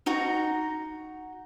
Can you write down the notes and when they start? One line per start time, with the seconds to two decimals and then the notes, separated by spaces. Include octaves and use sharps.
0.06 D#4 F#4 A#5